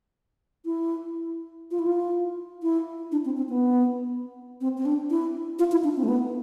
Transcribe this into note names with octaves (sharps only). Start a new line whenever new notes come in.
E4
F4
E4
F4
E4
D4
C4
C4
B3
C4
C4
D4
E4
F4
E4
D4
C4
A3
B3